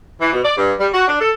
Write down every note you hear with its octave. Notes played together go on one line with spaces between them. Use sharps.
E3
B2
D5
G2
G3
F#4
D4
A4